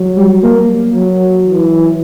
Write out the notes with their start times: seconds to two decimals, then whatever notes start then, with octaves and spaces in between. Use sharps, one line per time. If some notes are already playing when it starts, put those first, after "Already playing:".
Already playing: F#3
0.17 G3
0.43 A#3
0.94 F#3
1.46 E3